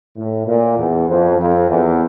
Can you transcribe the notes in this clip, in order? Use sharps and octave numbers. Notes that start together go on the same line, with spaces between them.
A2
A#2
E2
F2
F2
E2